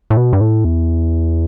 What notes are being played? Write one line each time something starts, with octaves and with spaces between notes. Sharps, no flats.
A2
B2
G2
A2
E2